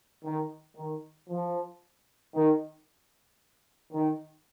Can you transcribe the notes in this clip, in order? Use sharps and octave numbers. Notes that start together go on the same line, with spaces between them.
D#3
D#3
F3
D#3
D#3